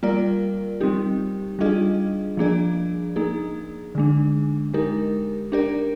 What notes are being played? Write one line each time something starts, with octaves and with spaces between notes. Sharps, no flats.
G3 A#3 F4 A#4 D5
G3 C4 D#4 G4
G3 D4 F4 G#4 D#5
F3 A#3 D4 G#4 D5
A#3 D#4 G#4
D3 G#3 D4
G#3 D#4 G4 A#4
D4 G4 A#4 D5